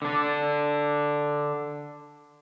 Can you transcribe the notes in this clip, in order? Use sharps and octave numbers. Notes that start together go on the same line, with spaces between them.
D3 D4